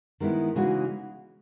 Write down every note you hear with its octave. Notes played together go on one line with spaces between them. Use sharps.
D#3 G#3 B3 E4
C#3 E3 G#3 D#4 F#4